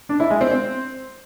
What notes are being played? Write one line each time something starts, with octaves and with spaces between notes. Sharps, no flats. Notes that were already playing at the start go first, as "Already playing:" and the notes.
D4
E4
G#3
C4
C4